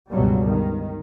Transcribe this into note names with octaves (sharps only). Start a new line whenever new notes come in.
C#2 G2 B2 F#3 G3
D#3